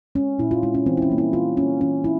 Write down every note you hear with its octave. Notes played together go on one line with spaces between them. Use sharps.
G#3 C4 C#4
A#2 E4
F4
G#3 C4 E4
C#4
E3 C4
E4
C#4
G3 A#3
E4
E3 F4
G3 A#3 C#4
E3 C#4
C4 E4